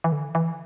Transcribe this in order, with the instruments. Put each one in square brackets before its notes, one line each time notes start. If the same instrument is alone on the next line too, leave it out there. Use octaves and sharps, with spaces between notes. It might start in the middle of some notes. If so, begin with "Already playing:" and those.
[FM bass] E3
D3
E3